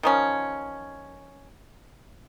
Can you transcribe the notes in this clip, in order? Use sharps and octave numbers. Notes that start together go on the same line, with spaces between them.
D#3 F3 C#4